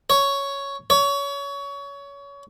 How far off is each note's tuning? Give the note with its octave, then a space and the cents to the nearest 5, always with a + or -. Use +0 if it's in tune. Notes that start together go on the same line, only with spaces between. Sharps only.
C#5 +5
C#5 +25